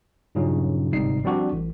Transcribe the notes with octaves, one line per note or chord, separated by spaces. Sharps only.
G2 A#2 C#3 F#3 C#4 D#4
G1 G#2 C3 G3 D#4 C7
F3 G3 C4 D4 F#4 G4
A1